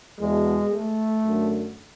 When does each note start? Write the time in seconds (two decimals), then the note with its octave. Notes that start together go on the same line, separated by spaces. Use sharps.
0.20 E2 B2 G#3
0.73 A3
1.26 F#2 D3